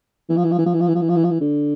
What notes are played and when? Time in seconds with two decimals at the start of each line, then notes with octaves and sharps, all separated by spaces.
0.30 E3
0.37 F3
0.44 E3
0.52 F3
0.58 E3
0.66 F3
0.74 E3
0.81 F3
0.88 E3
0.95 F3
1.02 E3
1.09 F3
1.16 E3
1.24 F3
1.31 E3
1.41 D3